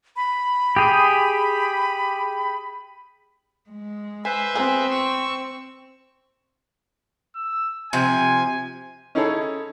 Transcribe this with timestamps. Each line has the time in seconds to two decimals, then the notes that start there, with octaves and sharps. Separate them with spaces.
0.16 B5
0.76 G4 G#4
3.70 G#3
4.25 B4 C5 E5 G#5
4.55 B3 C4 F4 G#4
4.91 C#6 E6
7.35 E6
7.93 C3 F3 G#5
9.15 C#4 D#4 E4 G#4 A4 C#5